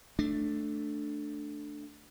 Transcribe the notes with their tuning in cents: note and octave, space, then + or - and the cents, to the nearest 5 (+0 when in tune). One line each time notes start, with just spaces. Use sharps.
A3 +0 D4 +5